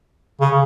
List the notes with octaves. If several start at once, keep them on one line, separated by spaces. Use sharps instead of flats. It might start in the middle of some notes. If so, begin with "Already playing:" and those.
C#3